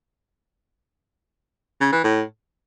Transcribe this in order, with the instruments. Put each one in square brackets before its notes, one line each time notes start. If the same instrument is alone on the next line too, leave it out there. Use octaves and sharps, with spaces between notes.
[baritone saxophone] C#3
E3
A2